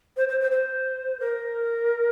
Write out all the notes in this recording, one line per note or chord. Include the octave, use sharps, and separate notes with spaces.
C5
C5
C5
C5
A#4